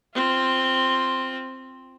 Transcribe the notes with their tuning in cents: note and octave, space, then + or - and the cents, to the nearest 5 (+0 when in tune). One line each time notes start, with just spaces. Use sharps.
C4 +0 F4 +0